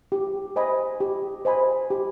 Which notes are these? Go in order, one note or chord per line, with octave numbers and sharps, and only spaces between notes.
G4
C5 D#5 G#5 B5
G4
C5 D#5 G#5 B5
G4